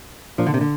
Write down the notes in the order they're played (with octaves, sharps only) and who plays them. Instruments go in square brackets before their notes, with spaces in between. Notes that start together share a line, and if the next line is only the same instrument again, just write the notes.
[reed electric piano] A#2 A#3 D4 [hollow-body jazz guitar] F3
[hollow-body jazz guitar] D3
C3
D3